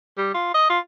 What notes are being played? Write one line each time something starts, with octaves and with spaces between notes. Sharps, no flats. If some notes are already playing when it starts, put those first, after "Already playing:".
G3
F4
D#5
F4